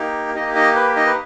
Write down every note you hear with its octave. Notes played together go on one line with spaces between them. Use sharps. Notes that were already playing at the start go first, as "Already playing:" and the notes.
Already playing: A#3 D#4 G4
A#3 D#4 G4 D#5
D#4 D#5
B4
D#4 D#5
B4